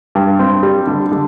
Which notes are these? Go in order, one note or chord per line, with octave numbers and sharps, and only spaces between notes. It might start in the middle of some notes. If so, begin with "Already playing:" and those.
G2
C4
G3
D3
D3